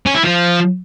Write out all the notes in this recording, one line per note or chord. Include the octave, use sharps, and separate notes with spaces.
C#4
E4
F3